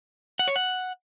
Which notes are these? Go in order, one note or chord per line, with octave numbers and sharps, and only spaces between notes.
F#5
C#5
F#5